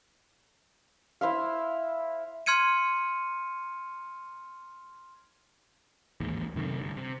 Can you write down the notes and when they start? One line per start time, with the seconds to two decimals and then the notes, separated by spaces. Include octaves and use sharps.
1.21 E4 C5 E5 F5
2.46 C6 F6 G#6 C#7 D#7
6.20 A1 D#2 G#2
6.55 F#2 C3 D#3 A3
6.80 G1
6.97 C3